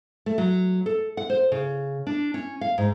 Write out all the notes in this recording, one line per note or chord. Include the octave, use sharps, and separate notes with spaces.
A3
F#3
A4
F#5
C5
C#3
D4
C#4
F5
G#2